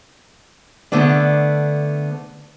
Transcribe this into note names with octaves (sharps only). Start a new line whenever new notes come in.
D3 A3 B3 D4